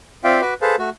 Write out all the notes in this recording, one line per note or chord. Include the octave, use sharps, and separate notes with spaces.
C4 F4 D5 E5 F5 G5
F#4 B4 D6
G#4 A4 B4 C5 F5 A5
A3 F#4